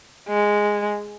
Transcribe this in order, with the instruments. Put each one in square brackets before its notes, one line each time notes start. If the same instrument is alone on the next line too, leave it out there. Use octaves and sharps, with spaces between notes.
[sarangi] G#3